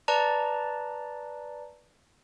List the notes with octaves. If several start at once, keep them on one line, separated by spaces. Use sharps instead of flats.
B4 D5 A5 A#5